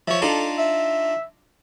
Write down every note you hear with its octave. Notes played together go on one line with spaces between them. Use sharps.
F3 C#5 E5
D4 D#4 F4 A4
E5